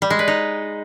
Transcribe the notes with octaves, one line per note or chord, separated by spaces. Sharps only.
G3
G#3
B4
D#4